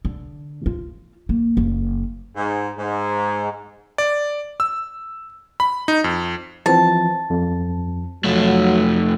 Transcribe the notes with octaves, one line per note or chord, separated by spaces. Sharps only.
D3
F4
A#3
F#1
G#2
G#2
D5
E6
B5
D#4
F2
E3 F3 C4 A5
F2
F2 F#3 A3 F#4